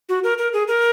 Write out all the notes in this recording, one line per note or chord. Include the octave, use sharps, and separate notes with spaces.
F#4
A#4
A#4
G#4
A#4